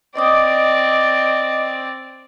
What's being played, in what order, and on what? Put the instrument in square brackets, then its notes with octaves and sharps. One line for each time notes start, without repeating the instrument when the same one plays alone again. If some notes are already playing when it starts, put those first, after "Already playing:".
[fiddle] C4 D5 [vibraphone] D#5 D6 D#6